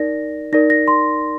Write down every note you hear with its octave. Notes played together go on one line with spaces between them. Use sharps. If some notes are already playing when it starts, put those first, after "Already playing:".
Already playing: D#4 A#4 D5 A#6
D#4 A#4 D5 A#6
A#6
C6